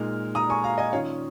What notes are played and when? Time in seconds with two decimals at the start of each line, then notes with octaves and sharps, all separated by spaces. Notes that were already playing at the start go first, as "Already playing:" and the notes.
Already playing: A#2 G#3 D#4 F6
0.35 A#5 D#6
0.50 G#5 C#6
0.64 F5 A#5
0.78 D#5 G#5
0.92 D#3 C#4 F4 C#5 F5